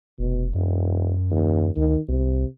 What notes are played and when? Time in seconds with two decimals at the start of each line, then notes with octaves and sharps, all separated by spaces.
0.19 F1 B2
0.54 E1 F#2
1.31 D#2
1.76 D2 D#3
2.08 C2 C3